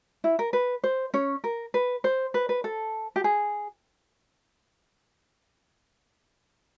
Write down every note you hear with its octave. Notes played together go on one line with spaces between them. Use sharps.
E4
A#4
B4
C5
C#4 C#5
A#4
B4
C5
B4
B4
A4
G4
G#4